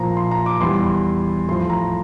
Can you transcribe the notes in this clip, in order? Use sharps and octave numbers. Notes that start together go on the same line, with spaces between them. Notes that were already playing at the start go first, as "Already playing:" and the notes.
Already playing: A#2 F3 A#5
C6
A#5
D6
E2 E3 G3 C6
A2 F3 C6
A#5